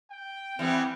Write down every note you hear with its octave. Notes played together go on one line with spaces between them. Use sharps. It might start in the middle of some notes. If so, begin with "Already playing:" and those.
G5
E3 G3 B3 C4